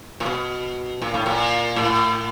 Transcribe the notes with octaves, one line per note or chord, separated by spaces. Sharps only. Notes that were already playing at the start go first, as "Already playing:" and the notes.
A#2
B2
A#2
A2
A#2
A2